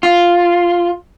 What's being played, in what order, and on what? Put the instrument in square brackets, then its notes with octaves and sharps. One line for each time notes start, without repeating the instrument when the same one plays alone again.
[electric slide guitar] F4